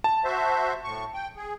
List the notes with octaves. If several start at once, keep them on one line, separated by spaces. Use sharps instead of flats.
A5
F#4 C5 E5
A2 C#6
G5
G#4